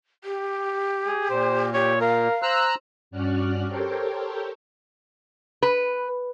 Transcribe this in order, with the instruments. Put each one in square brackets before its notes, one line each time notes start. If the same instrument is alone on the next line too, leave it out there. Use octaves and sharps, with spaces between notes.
[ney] G4
[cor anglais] G#4
[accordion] A#2 [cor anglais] C5
[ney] G4 [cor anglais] C#5
[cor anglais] A#4 [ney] F5
[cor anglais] C5 [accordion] A#5 E6 F#6
[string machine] G2 C#4 F#4 D5 F6 F#6
G4 A4 A#4 C5 C#5 G5
[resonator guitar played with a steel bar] B4